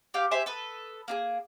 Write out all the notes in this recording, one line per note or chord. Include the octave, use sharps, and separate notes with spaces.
G4 F5 G5
G4 C5 E5 G#5
A4 B4 D#6
A#3 D4 G#4